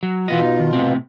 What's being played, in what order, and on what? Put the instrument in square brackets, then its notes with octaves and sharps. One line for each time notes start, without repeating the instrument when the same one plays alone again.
[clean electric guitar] F#3
[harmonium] B2 F4 [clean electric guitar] E3 B3 D#5
[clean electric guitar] D#4
D#3
A2 C3 C4